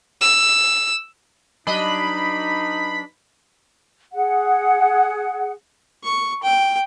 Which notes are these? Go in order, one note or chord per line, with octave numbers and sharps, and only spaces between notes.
E6
F#3 D4 D#4 B4 D#5 B5
G#4 F#5
C#6
G5